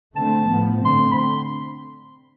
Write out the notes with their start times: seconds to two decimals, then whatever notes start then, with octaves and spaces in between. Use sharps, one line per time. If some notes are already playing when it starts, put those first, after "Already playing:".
0.16 D3 A3 C4 A5
0.50 A2 F3 B3
0.84 D3 A3 C4 C6
1.12 B5
1.18 C6